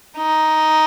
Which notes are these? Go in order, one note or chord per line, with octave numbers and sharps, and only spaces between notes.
D#4